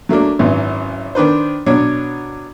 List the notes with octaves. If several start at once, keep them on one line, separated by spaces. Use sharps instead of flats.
F#3 A3 A#3 D4
G#1 F#2 E3
D#3 D4 B4 C5
B2 F#3 D4 C#5